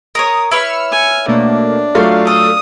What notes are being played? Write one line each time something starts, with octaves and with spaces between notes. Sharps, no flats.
A#4 B4 C#5 D#6
E4 B4 C#5 E6 F6 C#7
G#5
B2 A3 A#3 D4
F#3 A3 F4 D5 F5
A4 D#6